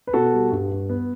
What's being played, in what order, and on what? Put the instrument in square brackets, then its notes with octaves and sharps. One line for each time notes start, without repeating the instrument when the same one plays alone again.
[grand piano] B4
B2 F#4 A4
G3
G2
G2
B3